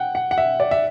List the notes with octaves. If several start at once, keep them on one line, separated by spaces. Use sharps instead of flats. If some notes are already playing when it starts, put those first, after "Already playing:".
Already playing: F#5 G5
F#5
F#5
E5
D5
E5